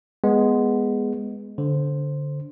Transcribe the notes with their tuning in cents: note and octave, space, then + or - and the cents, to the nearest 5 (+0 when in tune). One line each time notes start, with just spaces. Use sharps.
G#3 +0 B3 +0
D3 -10 C5 +0